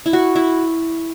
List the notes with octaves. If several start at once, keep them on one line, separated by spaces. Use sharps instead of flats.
E4
F#4
E4